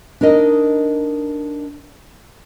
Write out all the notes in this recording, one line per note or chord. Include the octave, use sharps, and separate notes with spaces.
D4 D#4 A#4 D#5